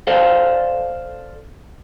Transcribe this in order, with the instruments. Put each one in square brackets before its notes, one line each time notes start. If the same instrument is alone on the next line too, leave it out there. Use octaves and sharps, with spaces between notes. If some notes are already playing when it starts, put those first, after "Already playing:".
[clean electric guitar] A4 C5 D5 F5